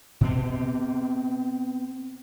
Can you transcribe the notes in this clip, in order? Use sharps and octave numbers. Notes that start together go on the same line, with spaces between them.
B2 C4